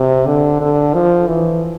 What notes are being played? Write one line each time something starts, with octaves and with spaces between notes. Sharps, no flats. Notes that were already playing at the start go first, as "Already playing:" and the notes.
Already playing: C3
D3
D3
F3
E3